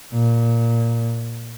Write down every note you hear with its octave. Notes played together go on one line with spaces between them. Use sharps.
A#2